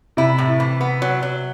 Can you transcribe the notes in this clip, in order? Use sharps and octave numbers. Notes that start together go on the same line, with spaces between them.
C3 E4
A2
E3
B3
F#3
F#3